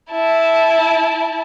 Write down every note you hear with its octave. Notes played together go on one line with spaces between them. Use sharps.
E4 A5